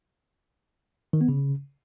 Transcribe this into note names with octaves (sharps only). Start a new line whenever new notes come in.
D#3
B3
C#3